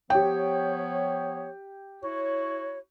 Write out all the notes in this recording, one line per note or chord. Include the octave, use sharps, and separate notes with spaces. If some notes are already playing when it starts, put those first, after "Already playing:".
F3 B3 G4 C#5 G5
E4 F#4 C#5